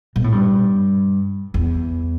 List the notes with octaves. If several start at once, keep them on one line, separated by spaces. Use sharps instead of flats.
B2
A2
G2
E2